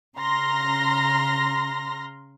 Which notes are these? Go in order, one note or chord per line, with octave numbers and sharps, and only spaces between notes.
C#3 A#5 C6 F6 A#6